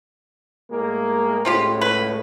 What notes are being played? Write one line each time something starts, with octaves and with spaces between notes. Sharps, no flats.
A2 G#3 A#3
C#2 A2 C4 F4 G4
B4